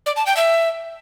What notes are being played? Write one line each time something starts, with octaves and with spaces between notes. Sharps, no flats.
D5
A5
G5
E5